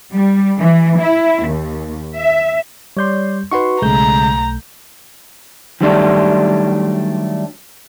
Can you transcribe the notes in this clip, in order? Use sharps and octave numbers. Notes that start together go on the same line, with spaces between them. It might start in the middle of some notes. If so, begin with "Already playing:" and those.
G3
E3
E4
D#2
E5
G3 C#5 D5 C6 G6
D#4 F#4 B4 C6 C#6
B1 C#3 G#3 A3 A#5 G6
D#3 F#3 G3 A3 D4